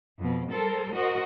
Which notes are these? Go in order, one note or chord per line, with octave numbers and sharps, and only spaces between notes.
F2 B2
G3 A4 A#4 C5
F#4 A#4 C5 D#5